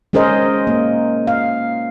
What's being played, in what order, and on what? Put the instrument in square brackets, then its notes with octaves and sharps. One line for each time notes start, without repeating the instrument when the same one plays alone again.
[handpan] G#3 C#4 G#4 A#4 C5 D#5
A#3
F5